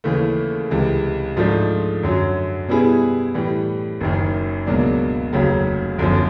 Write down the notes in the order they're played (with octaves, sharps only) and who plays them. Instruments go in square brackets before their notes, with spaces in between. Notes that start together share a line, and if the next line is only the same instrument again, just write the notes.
[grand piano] D#2 C#3 E3 A3
C#2 C3 E3
G#2 F3 A3 D4 F4
F#2 D3 F#3
B2 G3 B3 E4 G#4
A2 E3 G3
F#1 F#2 D#3
C#2 B2 F#3 A#3 D4
F1 D#2 C#3 F#3
G1 F#2 D3 F3